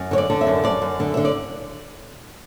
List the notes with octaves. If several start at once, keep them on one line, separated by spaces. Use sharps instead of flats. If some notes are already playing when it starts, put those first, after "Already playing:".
Already playing: F#2
D3 C#5
D5
D3
E5
F#2
F#2 D5
F#2
D3
D3 E5
D5